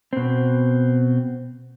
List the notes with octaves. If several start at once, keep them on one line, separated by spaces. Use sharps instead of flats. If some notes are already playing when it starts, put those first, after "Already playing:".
B2 C4